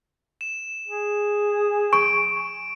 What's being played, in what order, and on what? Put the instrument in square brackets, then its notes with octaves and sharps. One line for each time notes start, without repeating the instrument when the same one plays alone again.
[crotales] E7
[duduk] G#4
[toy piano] C#6 [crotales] D7